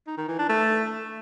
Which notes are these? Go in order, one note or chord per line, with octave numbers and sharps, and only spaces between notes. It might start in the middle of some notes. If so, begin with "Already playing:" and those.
D#4
D#3
E3
D4
A3